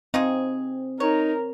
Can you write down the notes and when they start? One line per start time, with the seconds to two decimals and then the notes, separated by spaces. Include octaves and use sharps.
0.14 C4 D#4 F4 G#4
1.00 D#4 A#4 C#5